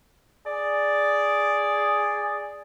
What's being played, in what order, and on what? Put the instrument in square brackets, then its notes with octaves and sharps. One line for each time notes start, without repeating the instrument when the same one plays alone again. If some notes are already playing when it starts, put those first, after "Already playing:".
[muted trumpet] G#4 [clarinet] D5